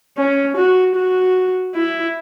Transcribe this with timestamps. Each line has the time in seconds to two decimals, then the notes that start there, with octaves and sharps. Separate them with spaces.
0.17 C#4
0.56 F#4
0.95 F#4
1.75 E4